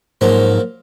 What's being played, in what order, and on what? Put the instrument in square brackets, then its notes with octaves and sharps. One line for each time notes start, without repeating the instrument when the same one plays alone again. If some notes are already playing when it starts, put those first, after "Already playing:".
[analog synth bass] G#2 [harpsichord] F3 F#3 A#3